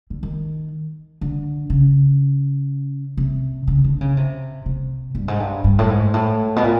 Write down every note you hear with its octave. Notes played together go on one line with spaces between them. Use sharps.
D3
D#3
D3
C#3
C3
C#3
D3
C#3
C3
C3
G2
G#2
G2
G2
A2
G#2
A2
B2
A#2